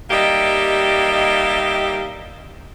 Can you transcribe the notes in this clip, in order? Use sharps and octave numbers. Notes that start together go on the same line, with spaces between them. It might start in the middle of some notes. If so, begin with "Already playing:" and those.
G3 A#3 D#4 G4 D#5 E5